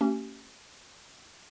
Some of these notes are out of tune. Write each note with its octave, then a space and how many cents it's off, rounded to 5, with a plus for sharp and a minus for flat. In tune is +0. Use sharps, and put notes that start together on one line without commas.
A#3 -45 C#4 +0 G4 -30